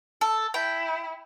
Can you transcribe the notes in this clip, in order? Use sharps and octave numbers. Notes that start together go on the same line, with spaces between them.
A4
E4 G5